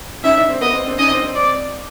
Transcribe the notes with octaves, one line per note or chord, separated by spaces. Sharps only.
C#4 D#4 E5
D4 E4
C4
B3 D#5
C4
C4 D4
C#4 D#4 D#5
C4 D4
C4
D5